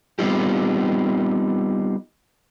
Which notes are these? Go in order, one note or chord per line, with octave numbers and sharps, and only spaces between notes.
G3 B3 C4 D#4 F4 G4